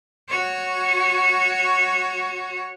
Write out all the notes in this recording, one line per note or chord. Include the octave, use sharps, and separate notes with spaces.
F#4 C#5